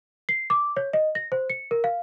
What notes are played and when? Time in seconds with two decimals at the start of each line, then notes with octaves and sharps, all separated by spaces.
0.29 C7
0.50 D6
0.76 C#5
0.93 D#5
1.15 A#6
1.32 C5
1.50 C#7
1.71 A#4
1.84 F5